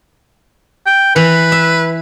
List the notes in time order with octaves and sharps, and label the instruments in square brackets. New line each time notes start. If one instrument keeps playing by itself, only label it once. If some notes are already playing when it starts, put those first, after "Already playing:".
[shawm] G5
[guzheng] E3 [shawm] B4
[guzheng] E5